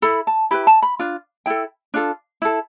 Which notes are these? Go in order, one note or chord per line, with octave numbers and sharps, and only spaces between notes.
E4 A4 B5
A5
E4 G4 B4 B5
A5
B5
D4 F4
E4 A4 G5
D4 F4 A4
E4 A4